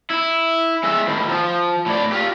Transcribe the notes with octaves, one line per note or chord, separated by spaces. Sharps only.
E4
G#3 E5
A2 D#3
F3
A2 D5
F4 G4